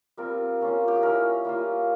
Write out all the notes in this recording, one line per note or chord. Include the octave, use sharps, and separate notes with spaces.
G3 C4 F4 A#4
A#3 C#4 F4
G4
G#4
G3 C#4 E4 A#4
G3 A#3 F4